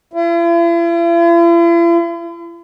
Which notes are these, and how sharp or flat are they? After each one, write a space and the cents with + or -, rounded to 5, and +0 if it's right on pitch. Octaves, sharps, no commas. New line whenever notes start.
E4 +45